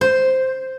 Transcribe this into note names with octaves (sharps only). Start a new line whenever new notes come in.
C5